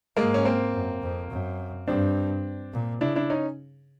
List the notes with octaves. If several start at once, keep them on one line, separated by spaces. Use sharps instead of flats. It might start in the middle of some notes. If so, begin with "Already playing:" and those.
G#2 G#3 A#3
C#4
A#3 C4
F#2
F2
F#2
G2 C4 D4
A#2
C#3 D4 E4
D4 E4
C#4 D#4